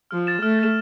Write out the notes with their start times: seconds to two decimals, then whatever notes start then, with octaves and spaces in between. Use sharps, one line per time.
0.11 F3 F6
0.27 A6 E7
0.43 A3 F6
0.59 A6 E7